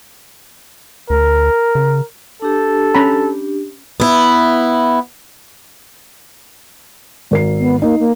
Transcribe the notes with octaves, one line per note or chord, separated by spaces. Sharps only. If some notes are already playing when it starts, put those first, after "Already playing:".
D2 A#4
C#3
D4 G4 A4
C#4 A#5 B5
B3 E4
G#1 A#4 C7
B3
A#3 D#4
A#3